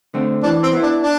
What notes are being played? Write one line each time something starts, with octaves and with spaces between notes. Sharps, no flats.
D3 A3 C4
E3 D4
C4
B3 E4
D4
D4